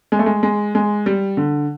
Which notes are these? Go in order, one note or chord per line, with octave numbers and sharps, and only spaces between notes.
G#3
A3
G#3
G#3
G#3
G3
D3